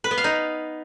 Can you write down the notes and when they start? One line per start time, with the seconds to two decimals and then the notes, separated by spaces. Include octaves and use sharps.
0.04 B4
0.11 B3
0.18 F5
0.24 D#4